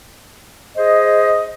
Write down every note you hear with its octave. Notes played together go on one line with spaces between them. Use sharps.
G#4 C5 D#5